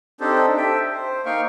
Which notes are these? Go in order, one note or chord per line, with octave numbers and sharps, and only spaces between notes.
C4 D4 D#4 G4 A4 C5
G4 A4 E5 G5
C5
A#3 D#4 F5 G5 C#6